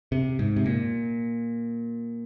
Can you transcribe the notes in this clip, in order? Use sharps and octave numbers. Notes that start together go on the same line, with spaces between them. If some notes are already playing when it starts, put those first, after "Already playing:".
C3
G#2
C3
A#2